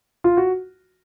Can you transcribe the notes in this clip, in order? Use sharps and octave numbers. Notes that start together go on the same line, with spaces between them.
F4
F#4